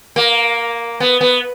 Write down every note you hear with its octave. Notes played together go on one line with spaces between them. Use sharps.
A#3
B3
B3